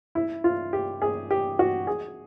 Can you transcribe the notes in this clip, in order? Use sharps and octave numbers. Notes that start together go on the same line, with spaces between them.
E4
F4
G4
G#4
G4
F#4
G#4